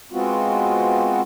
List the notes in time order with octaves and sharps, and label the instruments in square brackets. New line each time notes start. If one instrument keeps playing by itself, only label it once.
[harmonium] G#3 B3 C4 F4 F#4